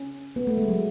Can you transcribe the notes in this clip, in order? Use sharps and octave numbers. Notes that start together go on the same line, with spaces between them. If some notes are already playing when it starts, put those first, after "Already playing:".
Already playing: C#4
B3
A3
G#3
F#3